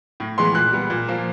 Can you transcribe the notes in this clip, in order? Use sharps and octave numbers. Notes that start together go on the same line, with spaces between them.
A2
E3 G#3 B3 C6
A#2 F#6
G3 B3
A#2
F3 A#3